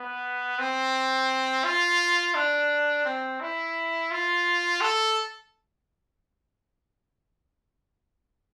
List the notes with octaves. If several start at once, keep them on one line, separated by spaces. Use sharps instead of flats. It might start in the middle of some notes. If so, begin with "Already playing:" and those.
Already playing: B3
C4
F4
D4
C4
E4
F4
A4